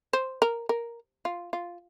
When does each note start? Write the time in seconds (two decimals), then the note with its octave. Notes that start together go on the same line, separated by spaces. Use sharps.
0.13 C5
0.42 A#4
0.69 A#4
1.25 F4
1.53 F4